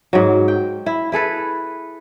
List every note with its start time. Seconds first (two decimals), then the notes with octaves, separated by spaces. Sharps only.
0.13 G#2 F#3
0.48 G5
0.86 E4
1.12 E4 G#4 A4 B4